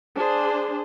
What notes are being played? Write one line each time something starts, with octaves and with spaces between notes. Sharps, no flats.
D4 G#4 C5